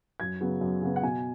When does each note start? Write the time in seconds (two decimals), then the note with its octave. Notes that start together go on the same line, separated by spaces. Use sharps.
0.20 F#2 G#6
0.41 C#3 F#3 B3
0.61 F#2
0.82 C#3 F#3 B3
0.96 F#5
1.03 B2 G#5